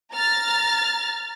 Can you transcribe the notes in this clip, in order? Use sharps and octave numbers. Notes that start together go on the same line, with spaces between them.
A#5 F6 A6